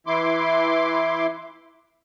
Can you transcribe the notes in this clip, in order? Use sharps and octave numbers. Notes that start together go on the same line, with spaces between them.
E3 E4 C6 D6